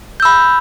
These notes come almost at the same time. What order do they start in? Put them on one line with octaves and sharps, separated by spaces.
G6 E6 B5